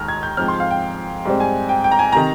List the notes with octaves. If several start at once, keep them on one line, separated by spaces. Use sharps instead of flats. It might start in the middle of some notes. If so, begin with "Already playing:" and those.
Already playing: D#2 D#3 G#3 A#5 F6
G#6
G6
G#2 F3 C4 F6
C6
F5
G5
G#2 G3 C4
G#5
G5
G5
A#5
G#5
C3 D#3 A#5